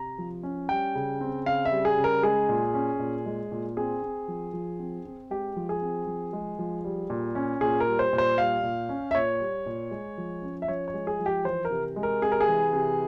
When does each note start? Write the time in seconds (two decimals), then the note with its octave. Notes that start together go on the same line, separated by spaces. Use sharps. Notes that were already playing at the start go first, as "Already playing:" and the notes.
Already playing: C3 A#5
0.18 F3
0.43 C#4
0.69 G3 G5
0.95 C#3
1.21 C4
1.46 C#3 F5
1.65 E5
1.71 G3
1.85 G#4
1.98 C#3
2.04 A#4
2.23 G#3 G#4
2.49 A#2
2.74 C#4
2.99 A#2
3.26 G#3
3.52 A#2
3.77 C4 G#4
4.03 C4
4.28 F3
4.53 F3
4.80 C4
5.05 C4
5.30 G#3 G4
5.56 F3
5.69 G#4
5.82 C4
6.07 F3
6.33 G#3
6.59 F3
6.84 G3
7.10 A#2
7.35 C#4
7.61 A#2 G#4
7.80 A#4
7.87 G3
7.99 C5
8.13 A#2
8.18 C5
8.38 G3 F5
8.63 A#2
8.89 C#4
9.11 E5
9.15 A#2 C#5
9.40 G3
9.66 A#2
9.91 G#3
10.18 F3
10.42 C#4
10.62 E5
10.68 F3 C#5
10.88 C#5
10.94 G#3
11.07 G#4
11.20 F3
11.26 G4
11.45 E3 C5
11.65 A#4
11.70 C3
11.96 G#3
12.03 A#4
12.22 C3 G#4
12.32 A#4
12.41 G#4
12.48 E3
12.73 C3